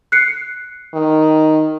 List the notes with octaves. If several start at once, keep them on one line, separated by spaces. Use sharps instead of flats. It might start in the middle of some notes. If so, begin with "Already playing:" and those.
F#6 C7 C#7
D#3